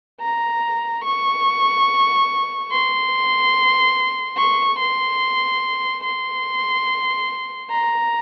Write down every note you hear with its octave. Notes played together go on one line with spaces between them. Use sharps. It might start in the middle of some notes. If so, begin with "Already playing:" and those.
A#5
C#6
C6
C#6
C6
C6
A#5